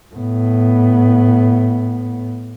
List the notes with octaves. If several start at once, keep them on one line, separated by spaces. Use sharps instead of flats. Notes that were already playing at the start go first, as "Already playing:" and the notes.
A2 B3